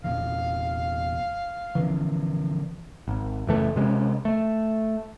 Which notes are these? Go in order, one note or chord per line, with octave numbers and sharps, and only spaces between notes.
E2 A#2 E3 F5
D3 E3 F3 C#4
G#1
F#1 E3 A3
C3 G#3 C#4
A3